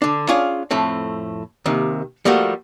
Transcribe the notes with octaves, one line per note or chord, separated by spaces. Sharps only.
D3 D4
C#4 D4 F4 G#4 F5 G#5
F2 A2 A3 C4
D#2 C3 D#3
F3 G3 A3 A#3 F#4 G4